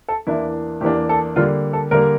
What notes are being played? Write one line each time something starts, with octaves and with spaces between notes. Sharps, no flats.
A4
E2 E3 A#3 D4 E4
E2 E3 A#3 D4 G4
A4
D3 G3 A#3 F4
A4
D3 G3 A#3 A#4